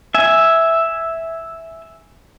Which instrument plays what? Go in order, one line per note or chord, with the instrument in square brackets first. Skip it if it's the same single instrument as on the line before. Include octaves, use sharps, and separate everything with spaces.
[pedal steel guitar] E5 G#5